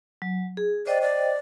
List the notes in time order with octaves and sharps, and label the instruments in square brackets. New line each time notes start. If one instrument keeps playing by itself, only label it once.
[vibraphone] F#3
G#4
[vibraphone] C5 D#5 G5 [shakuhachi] D5
[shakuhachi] D5